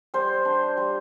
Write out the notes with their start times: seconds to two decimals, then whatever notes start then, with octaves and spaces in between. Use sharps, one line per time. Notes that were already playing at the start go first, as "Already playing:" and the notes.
0.14 G3 C5
0.45 D4
0.77 G3